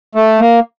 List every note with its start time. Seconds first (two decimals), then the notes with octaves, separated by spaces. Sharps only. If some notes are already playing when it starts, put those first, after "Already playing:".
0.15 A3
0.40 A#3